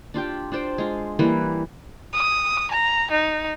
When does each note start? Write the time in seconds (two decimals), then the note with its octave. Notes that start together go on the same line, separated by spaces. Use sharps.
0.14 D4 F4 G4 G5
0.52 D4 F4 C5 G5
0.78 G#3 F4
1.19 E3 G3 A#3 B4
2.13 D#6
2.71 A#5
3.11 D#4